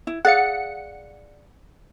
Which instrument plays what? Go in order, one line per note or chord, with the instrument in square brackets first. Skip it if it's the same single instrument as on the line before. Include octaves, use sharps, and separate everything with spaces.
[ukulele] E4
[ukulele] G#4 D5 F5 [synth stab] F#5 C#7